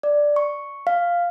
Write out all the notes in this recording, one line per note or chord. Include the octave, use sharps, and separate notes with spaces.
D5
C#6
F5